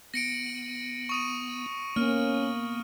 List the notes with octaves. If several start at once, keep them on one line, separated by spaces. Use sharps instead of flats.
B3 A#6 C#7 D7
C#6 D#6 D#7
A#3 B3 C#4 F6